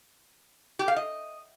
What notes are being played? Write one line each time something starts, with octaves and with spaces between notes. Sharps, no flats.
G4
F5
D#5